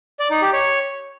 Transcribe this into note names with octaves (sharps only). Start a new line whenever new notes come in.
D5
D#4
G4
C#5